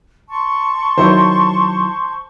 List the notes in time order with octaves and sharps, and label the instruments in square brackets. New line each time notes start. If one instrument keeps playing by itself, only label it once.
[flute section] A5 C6 C#6
[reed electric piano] D#3 F#3 E4 [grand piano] C5